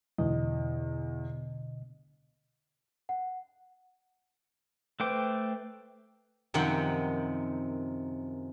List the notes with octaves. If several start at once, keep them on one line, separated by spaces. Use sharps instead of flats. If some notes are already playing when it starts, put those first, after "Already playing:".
E2 B2 D3 D#5
F#5
A3 B4 C5 G5 D6
F#2 C3 D#3 F3 F#5 G5